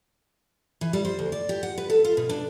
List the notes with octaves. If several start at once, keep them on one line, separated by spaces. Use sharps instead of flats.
E3
G3
C5
D2
D5
G4
F#5
B4
A4
F4
B2
D4